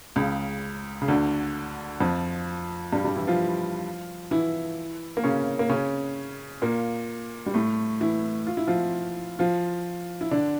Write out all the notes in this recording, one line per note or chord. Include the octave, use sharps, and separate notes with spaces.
C#2 C#3
C#3
D2 D3
F2 F3
G2 G3
G2 G3
E3 E4
F3 F4
E3 E4
A#3
C#3 C#4
A#3
C#3 C#4
A#2 A#3
G3
A2 A3
E3 E4
F4
E4
F3 F4
F3 F4
E4
D3 D4